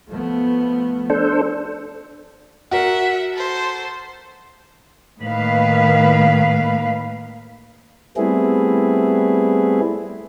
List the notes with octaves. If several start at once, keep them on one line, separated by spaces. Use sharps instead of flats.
F3 A3 B3
D4 A4 C5
F#4 A#4 E5 F#5
A4 C5
A2 D#3 A#3 B4 F5
G3 A3 B3 C4 E4 G#4